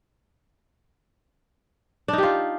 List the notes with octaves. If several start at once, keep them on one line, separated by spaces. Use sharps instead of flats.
D4 D#4 F4 G4